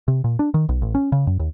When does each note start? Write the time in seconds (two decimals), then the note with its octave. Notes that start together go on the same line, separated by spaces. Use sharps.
0.08 C3
0.24 A#2
0.39 D4
0.54 D#3
0.69 B1
0.82 A1
0.95 C#4
1.12 C#3
1.27 F#2
1.40 D#2